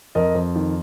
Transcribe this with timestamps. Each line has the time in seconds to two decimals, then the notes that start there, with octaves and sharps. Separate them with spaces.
0.15 F2 A#4 D#5
0.35 F2
0.56 D#3